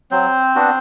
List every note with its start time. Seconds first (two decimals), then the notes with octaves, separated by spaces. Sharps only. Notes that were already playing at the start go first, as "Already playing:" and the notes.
0.11 F#3 C4 C5
0.55 B3 D4 F#4